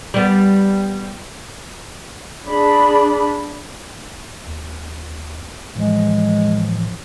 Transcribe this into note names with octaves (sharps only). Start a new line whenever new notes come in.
G3 B3
D4 G#4 B5
D#2
A2 E3 F3 G#3